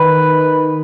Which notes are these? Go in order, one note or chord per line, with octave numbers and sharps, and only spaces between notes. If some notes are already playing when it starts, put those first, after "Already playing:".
Already playing: D#3 B4